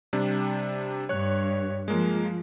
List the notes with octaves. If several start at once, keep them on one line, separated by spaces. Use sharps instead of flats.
C3 G3 D4
G2 C#5 F#6
F3 G#3 A#3